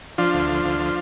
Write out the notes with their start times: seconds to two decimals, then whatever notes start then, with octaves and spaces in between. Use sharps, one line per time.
0.18 F3 D4 F4
0.34 D2
0.49 F3
0.65 D2
0.80 F3